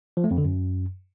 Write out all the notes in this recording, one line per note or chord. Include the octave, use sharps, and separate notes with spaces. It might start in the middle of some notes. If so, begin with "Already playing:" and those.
F3
A3
F2
D3
F#2